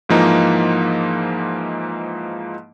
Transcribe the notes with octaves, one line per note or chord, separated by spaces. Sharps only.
G#2 E3 F3 A#3 D#4